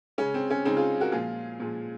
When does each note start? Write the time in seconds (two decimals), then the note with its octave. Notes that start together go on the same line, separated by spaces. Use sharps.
0.18 C#3 G#3 C#4
0.34 C4
0.50 C#4
0.65 C#3 G#3 C4 D#4
0.77 F4 G#4
1.01 F#4 A#4
1.12 A#2 F3 G#3 F4 G#4
1.60 A#2 F3 G#3